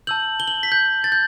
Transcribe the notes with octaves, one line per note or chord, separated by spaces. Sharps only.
A5 E6 G6 F#7
G7
F#7
B6
G6
A6
G6